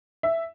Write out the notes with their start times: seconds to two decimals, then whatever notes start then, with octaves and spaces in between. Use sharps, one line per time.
0.23 E5